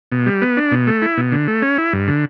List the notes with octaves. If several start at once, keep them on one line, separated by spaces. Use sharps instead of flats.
B2
G3
B3
D4
B2
A3
E4
B2
D3
A3
C#4
E4
G2
D3